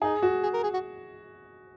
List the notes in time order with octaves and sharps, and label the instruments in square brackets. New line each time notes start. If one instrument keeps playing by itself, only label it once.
[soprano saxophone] D#4 [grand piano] G#4
[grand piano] F#4
[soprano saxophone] G#4
A#4
G#4
F#4